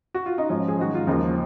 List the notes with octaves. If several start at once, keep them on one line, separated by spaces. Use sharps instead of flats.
F#4
F4
D#4
G#2 F3 C#4
G#4
G#2 D#3 F#3 F#4
F4
D#2 C#3 F3 D#4